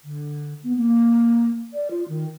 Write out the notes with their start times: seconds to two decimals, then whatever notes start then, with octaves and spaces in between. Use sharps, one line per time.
0.04 D3
0.63 B3
0.76 A#3
1.74 D5
1.91 F4
2.09 D#3